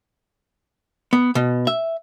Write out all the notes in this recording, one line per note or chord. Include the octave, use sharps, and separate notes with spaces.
B3
B2
E5